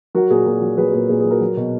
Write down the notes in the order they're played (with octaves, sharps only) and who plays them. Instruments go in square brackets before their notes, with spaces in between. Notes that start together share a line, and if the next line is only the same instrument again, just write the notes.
[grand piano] F#3 F#4 A#4
A#2 G#4
A#2 F#4 A#4
F#3
F#3 G#4 B4
A#2 G#4
A#2 G#4
G#4
F#3
F#4 A#4
F#3
B2